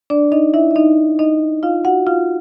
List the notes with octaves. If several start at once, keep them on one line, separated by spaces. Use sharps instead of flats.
D4 D5
D#4 D#5
E4 E5
E5
D#4 D#5
D#4 D#5
F4 F5
F#4 F#5
F4 F5